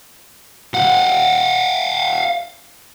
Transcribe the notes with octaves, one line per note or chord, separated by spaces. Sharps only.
F5 F#5